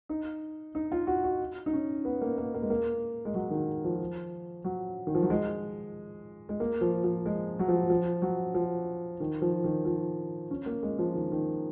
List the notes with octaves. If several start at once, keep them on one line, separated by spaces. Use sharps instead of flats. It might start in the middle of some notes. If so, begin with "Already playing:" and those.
D#4
D#4
F4
F#4
F#4
D#4
C#4
B3
A#3
A#3
A#3
G#3
A#3
G#3
F#3
D#3
F3
F#3
D#3
F3
F#3
G#3
G#3
A#3
F3
F3
G#3
F#3
F3
F3
F#3
F3
D#3
F3
D#3
F3
C#4
A#3
G#3
F3
D#3
D#3